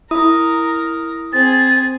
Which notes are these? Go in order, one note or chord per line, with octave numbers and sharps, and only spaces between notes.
E4 A#4 A#5 D#6
C4 G#4 A6